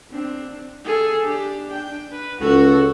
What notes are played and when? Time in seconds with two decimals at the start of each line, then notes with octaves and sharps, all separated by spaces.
0.11 C4 D4
0.85 G#4 A4
1.24 D4 G4
1.72 G5
2.12 B4
2.41 C#2 F#4 A4